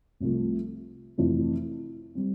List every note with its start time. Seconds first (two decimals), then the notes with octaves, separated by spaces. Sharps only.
0.20 C2 C3 F3 A3
1.18 F2 C3 E3 A3
2.15 G3 C4